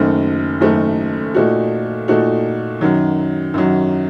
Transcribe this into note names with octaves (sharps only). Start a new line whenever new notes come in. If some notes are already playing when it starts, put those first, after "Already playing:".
Already playing: F#1 F#2 D#3 A3
F#1 F#2 D#3 A3
A#2 A3 D#4 F#4
A#2 A3 D#4 F#4
F#2 D#3 F#3
F#2 D#3 F#3